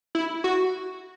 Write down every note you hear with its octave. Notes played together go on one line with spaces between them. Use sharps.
E4
F#4